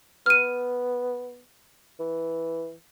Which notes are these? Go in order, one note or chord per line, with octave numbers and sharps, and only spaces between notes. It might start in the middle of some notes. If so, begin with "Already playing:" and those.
B3 F6 D#7
E3